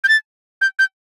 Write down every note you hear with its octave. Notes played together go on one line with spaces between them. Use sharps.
G6
A6
G6
G6